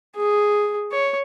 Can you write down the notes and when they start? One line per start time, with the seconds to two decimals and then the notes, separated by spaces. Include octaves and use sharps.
0.16 G#4
0.91 C#5